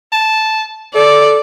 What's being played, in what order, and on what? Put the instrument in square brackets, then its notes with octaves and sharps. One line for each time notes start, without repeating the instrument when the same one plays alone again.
[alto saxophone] A5
[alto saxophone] A4 [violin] D5